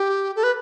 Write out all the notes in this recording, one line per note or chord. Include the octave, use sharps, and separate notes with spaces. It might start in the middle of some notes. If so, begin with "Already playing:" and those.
Already playing: G4
A4
B4